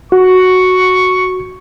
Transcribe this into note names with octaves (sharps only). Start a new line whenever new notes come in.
F#4 C#6